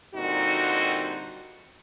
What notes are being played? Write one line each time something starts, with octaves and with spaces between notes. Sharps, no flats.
A#2 D3 G3 C4 D#4 F#4